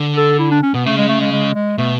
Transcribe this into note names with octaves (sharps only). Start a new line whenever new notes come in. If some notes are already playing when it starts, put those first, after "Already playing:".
Already playing: D3
A4
E4
D4
C#4
B2 B3
C#3 A3
G#3
A3
G#3
G#3
G#3
B2 A3